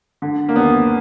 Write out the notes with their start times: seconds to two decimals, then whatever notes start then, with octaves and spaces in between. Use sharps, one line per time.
0.22 D3
0.49 A#3
0.56 D#2 B3